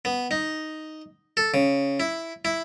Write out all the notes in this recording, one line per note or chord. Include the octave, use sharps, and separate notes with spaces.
B3
D#4
A4
C#3
E4
E4